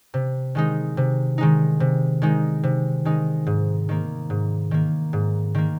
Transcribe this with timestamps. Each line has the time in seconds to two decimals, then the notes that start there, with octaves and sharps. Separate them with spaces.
0.14 C3
0.55 D#3 G#3 D#4
0.97 C3
1.38 D#3 G#3 D#4
1.80 C3
2.22 D#3 G#3 D#4
2.63 C3
3.05 D#3 G#3 D#4
3.46 G#2
3.89 D#3 A#3
4.30 G#2
4.71 D#3 A#3
5.13 G#2
5.55 D#3 A#3